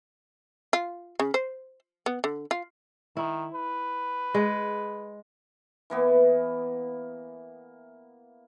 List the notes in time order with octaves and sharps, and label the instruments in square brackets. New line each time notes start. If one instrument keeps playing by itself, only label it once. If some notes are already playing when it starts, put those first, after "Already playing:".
[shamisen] F4
C#3
C5
B3
D3
F4
[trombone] D#3 [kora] E4
[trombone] B4
[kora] G#3
[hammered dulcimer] E3 A#3 B3